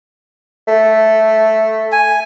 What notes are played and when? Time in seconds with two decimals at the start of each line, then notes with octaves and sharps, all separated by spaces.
0.68 A3
1.92 G#5